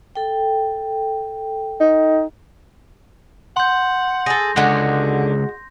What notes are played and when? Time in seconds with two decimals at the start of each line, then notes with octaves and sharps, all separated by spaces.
0.15 A4 G5
1.80 D#4
3.57 F#5 C6 G6
4.26 G#4 A4 A#6
4.56 C#2 D3 G#3 F#4 F#5